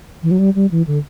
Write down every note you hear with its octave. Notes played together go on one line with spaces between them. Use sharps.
E3
F#3
G3
G3
E3
D3